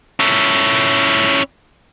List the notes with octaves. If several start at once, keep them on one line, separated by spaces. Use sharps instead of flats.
C#4 E4